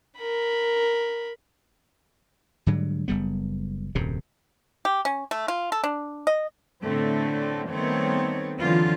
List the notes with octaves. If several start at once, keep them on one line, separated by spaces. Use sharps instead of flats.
A#4 B5
G#2 D3 F#3 G3
F#1 G3 B3
D#1 F#2 C3
G4
C#4
A3
F4
A4
D4
D#5
A2 D3 A3 C4
D#3 G3 A3 B3 C4 C#5
D3 E3 F#3 C4 F4